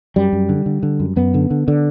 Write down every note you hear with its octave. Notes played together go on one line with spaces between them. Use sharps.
F#2 G3
F#2
D3
D3
D3
F#2
F#2 B3
D3
D3
D3